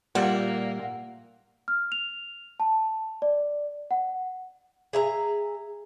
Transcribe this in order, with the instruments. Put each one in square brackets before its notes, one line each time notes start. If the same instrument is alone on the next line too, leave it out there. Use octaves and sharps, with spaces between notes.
[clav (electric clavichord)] A#2 G3 [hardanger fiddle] A#3 [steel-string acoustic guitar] E5 F#5
[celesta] F6
F7
A5
D5
F#5
[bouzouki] G#4 E5 A#5